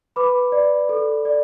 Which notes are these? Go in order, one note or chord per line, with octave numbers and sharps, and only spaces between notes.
B4 B5 D6
D5
A4
D5